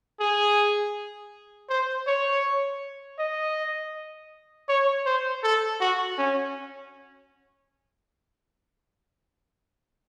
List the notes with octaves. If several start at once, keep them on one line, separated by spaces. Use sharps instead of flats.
G#4
C5
C#5
D#5
C#5
C5
A4
F#4
C#4